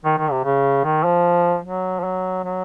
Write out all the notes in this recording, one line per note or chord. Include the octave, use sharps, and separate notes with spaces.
D#3
D#3
C3
C#3
D#3
F3
F#3
F3
F#3
F#3